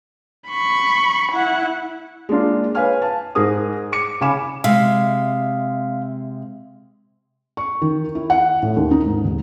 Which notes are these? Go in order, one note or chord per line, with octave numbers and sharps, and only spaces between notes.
B5 C#6
E4 F#5
G#3 A#3 D4 F4
B4 C#5 F5 G#5 F6
F5 A5
G#2 G#4 A#4 D#6
D6 C#7
C#3 F5 G#5 B5 D6 E7
C3 G#3 E5 F5
C#6
D#3
E4
F#5
A2
D#2
D#4
G#2
D#1